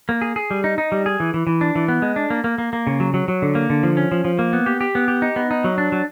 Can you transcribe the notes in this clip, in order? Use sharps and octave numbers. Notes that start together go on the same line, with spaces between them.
A#3
G#4
G#4
G3
D#4
D#4
G3
G#4
E3
E3
E3
D4
E3
B3
G#3
D4
A#3
A#3
A#3
A#3
C#3
F#3
F#3
F#3
D3
A#3
D3
F3
C#4
F3
F3
A#3
B3
G4
G4
B3
G4
D#4
B3
D#4
F#3
D4
F#3